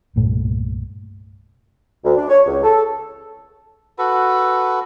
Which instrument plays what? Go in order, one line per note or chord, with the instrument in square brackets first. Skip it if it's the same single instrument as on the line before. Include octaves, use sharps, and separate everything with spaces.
[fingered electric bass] C2 G2 A#2 A3
[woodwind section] D2
D4
C#5
C#2
A4
[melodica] F#4 A4 B4